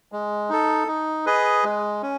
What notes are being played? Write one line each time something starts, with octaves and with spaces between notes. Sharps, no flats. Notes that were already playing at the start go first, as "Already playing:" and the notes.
G#3
D#4 A4
D#4
G#4 B4 D#5
G#3
C#4